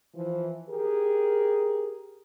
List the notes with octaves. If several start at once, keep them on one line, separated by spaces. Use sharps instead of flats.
E3 F3
G4 G#4 A#4